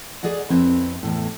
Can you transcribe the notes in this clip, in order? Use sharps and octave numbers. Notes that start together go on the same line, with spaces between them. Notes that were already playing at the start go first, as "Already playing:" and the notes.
G#4 D5 D#5 F#5
F2 C4 E4 B4 C#5
E2 A2